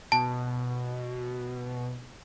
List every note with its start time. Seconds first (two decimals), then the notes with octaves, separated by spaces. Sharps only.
0.12 B2 A5